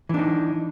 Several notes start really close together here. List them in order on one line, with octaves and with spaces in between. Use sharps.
E3 D4 D#4